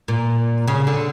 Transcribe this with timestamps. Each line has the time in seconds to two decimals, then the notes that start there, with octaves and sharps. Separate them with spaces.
0.08 A#2
0.68 C#3
0.87 D3